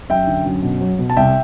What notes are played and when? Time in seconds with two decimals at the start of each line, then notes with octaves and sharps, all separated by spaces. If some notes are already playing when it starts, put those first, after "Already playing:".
0.09 F#2 E5 G5
0.27 D3
0.46 F#2
0.63 B2
0.81 F#3
0.99 B2
1.10 A5
1.17 C2 E5 G5